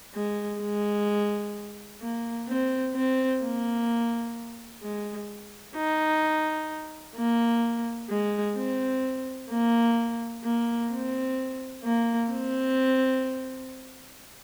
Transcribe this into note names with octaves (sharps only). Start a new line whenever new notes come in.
G#3
G#3
A#3
C4
C4
A#3
G#3
D#4
A#3
G#3
C4
A#3
A#3
C4
A#3
C4